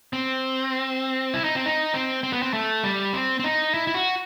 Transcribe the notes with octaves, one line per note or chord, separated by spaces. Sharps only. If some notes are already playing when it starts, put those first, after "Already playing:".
C4
E4
D#4
C4
D#4
C4
C4
B3
C4
A3
G3
C4
C4
D#4
E4
E4
F#4